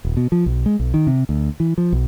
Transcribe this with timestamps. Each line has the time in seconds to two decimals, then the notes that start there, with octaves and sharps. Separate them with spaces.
0.05 D#1
0.17 B2
0.32 F3
0.46 B1
0.66 G#3
0.79 B1
0.94 D#3
1.07 C3
1.29 D2
1.60 E3
1.78 F3
1.92 B1